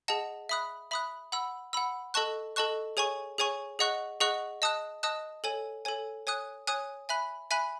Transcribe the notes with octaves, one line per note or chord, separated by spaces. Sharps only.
G#4 D#5 F#5 A5
E5 B5 D#6 F#6
E5 B5 D#6 F#6
F#5 B5 E6
F#5 B5 E6
A4 D#5 A5 C#6 F#6
A4 D#5 A5 C#6 F#6
G#4 C#5 G#5 C#6
G#4 C#5 G#5 C#6
G#4 D#5 F#5 C#6 F#6
G#4 D#5 F#5 C#6 F#6
D#5 A5 D#6 F#6
D#5 A5 D#6 F#6
A4 C#5 G#5
A4 C#5 G#5
C#5 G#5 D#6 F#6
C#5 G#5 D#6 F#6
E5 G#5 B5 F#6
E5 G#5 B5 F#6